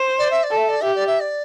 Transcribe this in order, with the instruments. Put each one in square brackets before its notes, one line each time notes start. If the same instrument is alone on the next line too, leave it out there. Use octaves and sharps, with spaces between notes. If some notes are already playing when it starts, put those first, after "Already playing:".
Already playing: [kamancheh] C5
[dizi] D5
E5
D5
[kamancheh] A4
[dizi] E5
D5
[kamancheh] G4 [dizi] E5
[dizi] D5
E5
D5